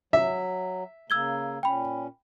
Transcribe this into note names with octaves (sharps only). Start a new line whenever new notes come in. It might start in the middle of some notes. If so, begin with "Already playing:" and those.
F#3 E5
C#3 A#3 E6 G#6 G7
A#2 C#4 G5 B5